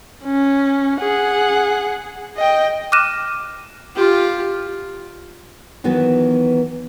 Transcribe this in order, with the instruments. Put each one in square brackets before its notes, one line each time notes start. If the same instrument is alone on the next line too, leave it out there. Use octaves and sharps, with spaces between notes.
[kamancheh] C#4
G#4 F#5
D#5 G5
[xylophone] D6 F6 F#6 A#6 D#7 E7
[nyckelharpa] F4 G4
[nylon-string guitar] D#3 E3 F#3 B3